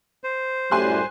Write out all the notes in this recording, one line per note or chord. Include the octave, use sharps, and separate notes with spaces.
C5
F#2 A2 G3 G#5 C6 F#6